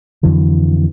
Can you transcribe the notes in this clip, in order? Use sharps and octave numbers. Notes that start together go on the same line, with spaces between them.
F2 D3 E3 F#3